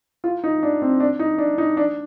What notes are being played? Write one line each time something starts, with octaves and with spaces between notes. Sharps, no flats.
F4
D#4
D4
C4
D4
D#4
D4
D#4
D4